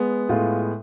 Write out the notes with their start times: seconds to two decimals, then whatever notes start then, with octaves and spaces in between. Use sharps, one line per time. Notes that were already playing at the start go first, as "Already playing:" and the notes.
Already playing: G#3 B3
0.29 A2 G#3 B3 F4